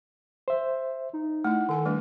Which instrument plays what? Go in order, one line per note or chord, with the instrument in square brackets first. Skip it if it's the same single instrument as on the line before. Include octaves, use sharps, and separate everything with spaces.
[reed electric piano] C5 E5
[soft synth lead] D#4
[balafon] A3 E4 [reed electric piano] F#5
[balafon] D#3 G#5 C6 [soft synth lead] A4
[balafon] G3 A3 D4 [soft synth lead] B4